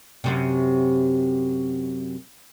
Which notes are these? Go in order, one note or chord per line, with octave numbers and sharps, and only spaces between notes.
F#2 C3